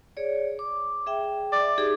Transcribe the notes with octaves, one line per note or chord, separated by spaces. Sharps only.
G#4 C#5 D5
D6
G#4 E5 G5
D5
D#4 G4 G#4